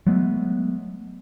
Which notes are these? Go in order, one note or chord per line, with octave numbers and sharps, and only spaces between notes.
F#3 G#3 A3 B3